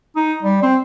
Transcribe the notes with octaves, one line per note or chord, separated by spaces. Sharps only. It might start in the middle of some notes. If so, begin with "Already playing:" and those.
D#4
G3
C4